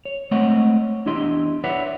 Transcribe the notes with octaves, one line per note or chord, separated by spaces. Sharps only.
C#5
G#3 A3 C4 C#5 D#5 F#5
E2 D4 E4 G4 D#5 C6
E4 B4 C#5 D5 E5 F#5